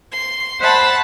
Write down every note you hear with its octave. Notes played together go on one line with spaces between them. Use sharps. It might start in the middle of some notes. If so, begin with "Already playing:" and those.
C6
C5 E5 F#5 A5 B5